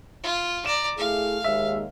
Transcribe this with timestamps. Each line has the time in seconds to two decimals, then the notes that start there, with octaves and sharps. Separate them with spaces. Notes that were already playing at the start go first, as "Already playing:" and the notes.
0.24 F4
0.66 D5 A#5 E7
0.98 A3 E4 G#4 F5
1.44 D#2 G#3 E5